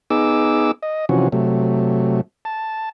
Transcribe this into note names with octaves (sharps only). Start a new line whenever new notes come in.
B3 D#4 G#4 D6 E6
D#5
C3 E3 F3 C#4 F#4
C3 F#3 A3
A5